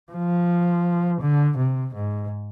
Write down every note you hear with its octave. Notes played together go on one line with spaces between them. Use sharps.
F3
D3
C3
G#2